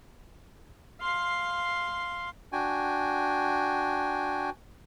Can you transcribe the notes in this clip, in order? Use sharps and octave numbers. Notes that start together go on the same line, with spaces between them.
F5 C6
D4 F#4 G5 G#5